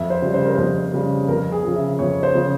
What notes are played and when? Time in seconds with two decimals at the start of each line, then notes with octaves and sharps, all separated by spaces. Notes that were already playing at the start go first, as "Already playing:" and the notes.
Already playing: F2 E5
0.10 C5
0.22 C#3 G3
0.34 C5
0.45 A#4
0.55 F2 C5
0.93 C#3 G3
1.28 F2 A#4
1.52 G#4
1.64 C#3 F3
1.76 E5
1.99 F2 C#5
2.23 C5
2.35 C#3 F3